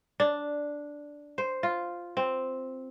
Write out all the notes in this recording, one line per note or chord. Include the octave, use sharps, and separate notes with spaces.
D4
C5
F4
C4